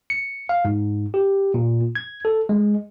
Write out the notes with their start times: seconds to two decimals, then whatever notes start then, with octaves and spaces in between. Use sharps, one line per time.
0.10 C#7
0.49 F5
0.65 G#2
1.14 G4
1.54 A#2
1.95 G#6
2.25 A4
2.49 G#3